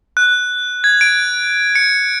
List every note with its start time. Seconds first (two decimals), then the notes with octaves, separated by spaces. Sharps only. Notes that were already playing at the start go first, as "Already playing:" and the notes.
0.17 F#6
0.84 G#6
1.01 D7
1.75 C#7